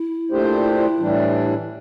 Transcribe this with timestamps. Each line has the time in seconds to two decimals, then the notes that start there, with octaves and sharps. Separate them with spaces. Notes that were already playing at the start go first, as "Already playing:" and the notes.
Already playing: E4
0.30 A#2 A3 D4 G4 C5
0.99 A2 E3 G3 D4